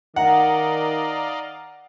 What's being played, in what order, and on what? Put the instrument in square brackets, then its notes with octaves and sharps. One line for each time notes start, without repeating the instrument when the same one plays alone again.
[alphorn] D#3 [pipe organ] D5 D#5 F5 [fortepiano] F#5 [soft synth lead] A#5